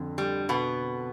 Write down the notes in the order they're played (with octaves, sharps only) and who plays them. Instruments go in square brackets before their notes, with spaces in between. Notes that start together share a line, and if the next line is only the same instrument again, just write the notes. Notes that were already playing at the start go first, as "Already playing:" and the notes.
Already playing: [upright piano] F2 D3
[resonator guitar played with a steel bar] G3
B2 B3